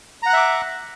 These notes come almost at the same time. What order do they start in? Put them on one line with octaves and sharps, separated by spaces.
A#5 F#5 F#6 E5 D6